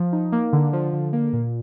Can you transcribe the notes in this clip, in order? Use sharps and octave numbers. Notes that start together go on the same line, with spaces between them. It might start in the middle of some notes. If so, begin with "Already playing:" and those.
Already playing: F3
D#4
A#3
D3
F3
D3
A#3
A#2